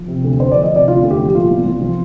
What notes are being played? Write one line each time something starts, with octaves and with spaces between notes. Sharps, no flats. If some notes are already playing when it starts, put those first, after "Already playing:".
Already playing: F3
C3
D2
D2 C5
D5
F3
D#5
C3 D5
D2 F4
D2
G4
F3
G4
A#2 F4
C2
C2
F3